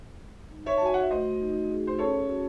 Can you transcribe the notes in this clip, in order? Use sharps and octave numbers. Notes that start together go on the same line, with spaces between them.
G#3
D#4
C#5 E5
A5
F#4 G#5
F#5
E5
A3 C5 D#5
D#4
G#4
C5
C#4 A4 C#5
F#4